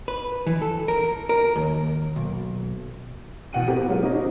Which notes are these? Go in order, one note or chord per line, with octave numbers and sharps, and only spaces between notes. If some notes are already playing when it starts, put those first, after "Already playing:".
B4
E3
A4
A#4
A#4
D#2
B1
E2 B2 F#4 F#5 G5 D#7
B3 C4 E4 G4 A4 A#4
F#3 G#3 A#3 F4
C4 D#4 E4 G4 C#5 D#5
C4 D4